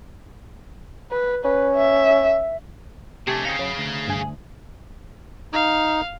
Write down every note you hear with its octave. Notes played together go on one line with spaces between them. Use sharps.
B4
C#4 B4
E5
C3 A3 D4 G4 G#4 A5 C#6
C4 C#4 D#4 G#4 F5
F#2 C#4 B5
D2 A#5
G2 G#5 D#6
D#4 F5